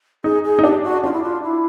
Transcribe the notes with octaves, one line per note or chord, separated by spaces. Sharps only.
D#4 G#4
G#4
D#4
D4 G4
F#4
D4 F4
E4
F4
E4